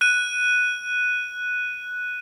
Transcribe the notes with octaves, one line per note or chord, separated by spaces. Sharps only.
F#6 D#7